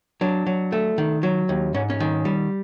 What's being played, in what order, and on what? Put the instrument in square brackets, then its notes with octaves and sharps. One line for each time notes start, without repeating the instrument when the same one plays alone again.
[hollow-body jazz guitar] F#3 D4
F#3
A3
D#3
F#3
D#2
G#2 C#4
C#4
D#3
G3